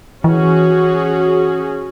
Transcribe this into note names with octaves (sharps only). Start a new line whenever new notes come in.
E3 C#4 F#4 G#4